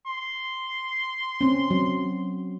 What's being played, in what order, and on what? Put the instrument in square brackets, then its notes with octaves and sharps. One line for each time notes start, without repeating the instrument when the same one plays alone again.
[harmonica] C6
[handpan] C4 C#4
F#3